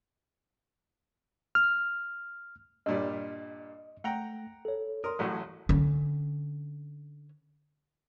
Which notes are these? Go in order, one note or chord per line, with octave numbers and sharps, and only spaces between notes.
F6
G2 A#2 G3 D#5
A3 F#5 G5 A#5
A4 C#5
A#4 C6 D#6
A1 A2 F#3
D3 C#4